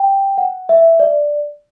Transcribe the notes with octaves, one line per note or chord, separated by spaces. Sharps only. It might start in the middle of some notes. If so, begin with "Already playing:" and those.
Already playing: G5
F#5
E5
D5